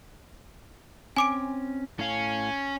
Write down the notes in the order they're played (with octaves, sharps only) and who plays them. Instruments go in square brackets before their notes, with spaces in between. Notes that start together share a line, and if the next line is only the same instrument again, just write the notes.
[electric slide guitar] C4 C#4 [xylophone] G#5 D6 D7
[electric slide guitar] A2 F5 [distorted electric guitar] C#4